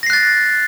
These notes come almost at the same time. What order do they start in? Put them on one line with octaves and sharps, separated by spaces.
A#6 C7 F#6 A6